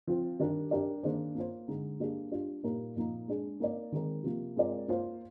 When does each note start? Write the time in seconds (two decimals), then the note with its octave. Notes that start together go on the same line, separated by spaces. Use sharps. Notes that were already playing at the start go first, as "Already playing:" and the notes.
0.07 F3 C4 F4
0.39 D#3 G3 D4 G4 A#4
0.71 G3 D4 G4 A#4 D5
1.03 D#3 A#3 D4 G#4 C5
1.35 A#3 F4 C5
1.68 D3 G#3 D#4
2.00 G3 A#3 D4 G#4
2.32 G3 D4 F4
2.64 A#2 G3 A#3 D#4 A#4
2.96 A#2 F3 A#3 D#4
3.28 G#3 D4 G#4
3.60 A#3 D#4 A#4 D5
3.92 D#3 G#3 C4 D#4 A#4
4.23 C3 F3 A#3
4.56 G#3 C4 F4 A#4 D5
4.88 A#3 F4 C5